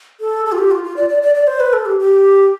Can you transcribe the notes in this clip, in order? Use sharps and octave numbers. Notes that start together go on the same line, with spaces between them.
A4
A4
F4
G4
F4
F4
D5
D5
D5
D5
C5
B4
A4
G4
G4